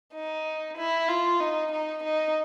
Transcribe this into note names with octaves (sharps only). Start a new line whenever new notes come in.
D#4
E4
F4
D#4
D#4
D#4